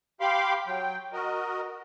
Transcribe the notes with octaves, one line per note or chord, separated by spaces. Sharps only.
G4 F5 B5 C6 D6
F#3 G5
F#4 A#4 D#5